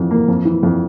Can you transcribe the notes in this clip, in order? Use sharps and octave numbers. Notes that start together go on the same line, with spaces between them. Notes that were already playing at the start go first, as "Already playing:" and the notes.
Already playing: F2 E3
A#3
F2
E3
F2